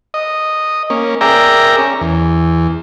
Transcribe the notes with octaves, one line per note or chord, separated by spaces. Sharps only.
D#5
A#3 C#4
G#4 A#4 D5 E5 G5 A#5
C#4
E2